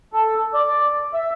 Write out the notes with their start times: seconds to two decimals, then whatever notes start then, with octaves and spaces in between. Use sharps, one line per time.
0.13 A4
0.54 D5
1.14 E5